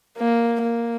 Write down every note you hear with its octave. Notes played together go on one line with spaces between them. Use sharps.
A#3
A#3